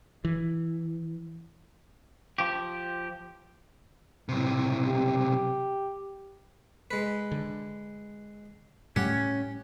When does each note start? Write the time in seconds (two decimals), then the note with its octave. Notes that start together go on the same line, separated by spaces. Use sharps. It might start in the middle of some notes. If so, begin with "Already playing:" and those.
0.25 E3
2.38 F3 G4
4.29 B1 A2 C3
4.83 G4
6.91 G#3 B4
7.32 D3
8.96 A2 G3 A3 C#4 G4 F#5